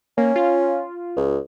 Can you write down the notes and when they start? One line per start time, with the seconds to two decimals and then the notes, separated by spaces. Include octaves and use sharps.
0.18 A#3 C#4
0.36 F4
1.17 C#2